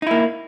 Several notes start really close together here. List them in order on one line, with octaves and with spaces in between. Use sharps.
D#4 E4 A#3